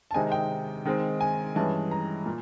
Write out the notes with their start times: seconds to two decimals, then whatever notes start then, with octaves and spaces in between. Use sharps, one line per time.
0.11 A5
0.14 C3 D#3 G#3 C4 D#4 G#5
0.32 G5
0.86 D#3 G#3 C4
1.21 G#5
1.55 G2 E3 G#3 C#4 A5
1.91 A#5
2.26 A#2